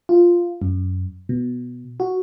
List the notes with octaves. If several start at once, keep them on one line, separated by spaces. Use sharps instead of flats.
F4
F#2
B2
F#4